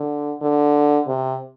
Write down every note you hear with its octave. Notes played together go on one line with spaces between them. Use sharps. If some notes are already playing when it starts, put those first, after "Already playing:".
Already playing: D3
D3
C3